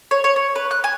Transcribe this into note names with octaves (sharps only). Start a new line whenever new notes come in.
C#5
C#5
C#5
B4
F#6
G#5